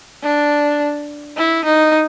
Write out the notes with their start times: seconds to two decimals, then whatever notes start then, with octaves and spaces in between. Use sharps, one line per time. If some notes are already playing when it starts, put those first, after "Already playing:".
0.23 D4
1.37 E4
1.65 D#4